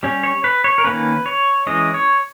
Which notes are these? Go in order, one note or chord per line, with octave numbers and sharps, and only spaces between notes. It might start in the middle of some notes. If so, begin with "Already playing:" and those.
G3 C#4
C#5
B4
C#5
A#4
D#3 A#3 C#4 B4
C#5
E3 G#3 C#4 D#5
C#5